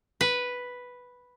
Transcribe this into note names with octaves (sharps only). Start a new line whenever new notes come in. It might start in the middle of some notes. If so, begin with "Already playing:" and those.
B4